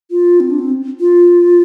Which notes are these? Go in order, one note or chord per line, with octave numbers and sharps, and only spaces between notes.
F4
C4
D4
C4
F4